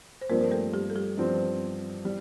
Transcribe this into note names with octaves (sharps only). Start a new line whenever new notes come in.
C5
G2 F3 A#3 C4 A#4
A#4
A3 A4
G3 G4
A4
G3 G4
G2 F3 C4
G3